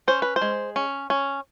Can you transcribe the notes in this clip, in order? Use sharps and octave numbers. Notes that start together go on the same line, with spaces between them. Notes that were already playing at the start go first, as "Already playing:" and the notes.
C#4 C5
B4
C5
G#3
C#4
C#4